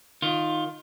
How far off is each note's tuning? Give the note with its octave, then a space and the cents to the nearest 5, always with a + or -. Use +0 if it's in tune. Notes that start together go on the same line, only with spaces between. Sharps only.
D#3 +0 F4 +10